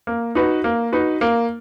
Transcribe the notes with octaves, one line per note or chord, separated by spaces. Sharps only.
A#3
D#4 F#4 B4
A#3
D#4 F#4 B4
A#3